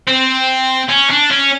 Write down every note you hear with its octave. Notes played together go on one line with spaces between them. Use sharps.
C4
C#4
D4
C#4